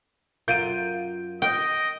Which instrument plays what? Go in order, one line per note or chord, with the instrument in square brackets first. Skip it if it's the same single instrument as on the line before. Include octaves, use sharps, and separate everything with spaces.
[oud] F#2 F4 A#4 [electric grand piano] G6 D7 D#7
[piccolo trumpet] D#5 [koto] G5